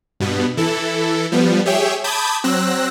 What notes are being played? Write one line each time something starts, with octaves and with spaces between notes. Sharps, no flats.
G2 B2 B3
E3 E4 A4
F3 G3 B3
G4 G#4 C#5 E5 G5
A5 B5 D6 D#6 G6 G#6
F#3 C4 E6 F#6 A#6